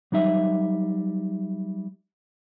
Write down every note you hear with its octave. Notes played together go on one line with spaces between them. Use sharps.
F#3 G3 D#4 E5